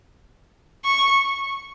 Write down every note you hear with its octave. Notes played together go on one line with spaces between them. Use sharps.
C#6